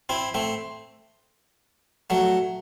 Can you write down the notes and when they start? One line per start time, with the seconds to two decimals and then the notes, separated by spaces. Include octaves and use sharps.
0.09 C4 E4
0.34 A3 C4
2.10 F#3 A3